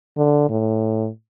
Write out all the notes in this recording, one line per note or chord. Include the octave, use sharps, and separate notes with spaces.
D3
A2